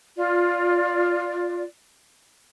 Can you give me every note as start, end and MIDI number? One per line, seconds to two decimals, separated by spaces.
0.17 1.64 65
0.17 1.64 74